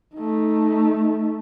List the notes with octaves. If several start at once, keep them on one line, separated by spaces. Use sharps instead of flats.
A3 D#4